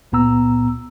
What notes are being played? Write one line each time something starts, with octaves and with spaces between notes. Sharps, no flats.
C#2 A#2 B3 A#5 E6